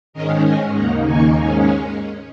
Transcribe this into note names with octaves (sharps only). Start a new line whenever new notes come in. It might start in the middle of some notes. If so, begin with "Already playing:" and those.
G#2 D#3 G#3 C#4 A#4 D#5
G#2 G#3 C#4 D#5 G#5
D#2 C#3 A#3 D#4 F#5 A#5
D#2 D#3 A#3 D#4 G#5 C#6
G#2 G#3 C#4